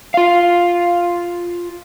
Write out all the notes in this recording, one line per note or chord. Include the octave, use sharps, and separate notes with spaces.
F4 F5